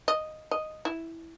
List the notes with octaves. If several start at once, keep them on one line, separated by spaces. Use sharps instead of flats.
D#5
D#5
E4